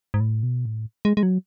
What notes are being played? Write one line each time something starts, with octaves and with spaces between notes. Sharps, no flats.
G#2
A2
B2
A2
G#3
G#3
F#3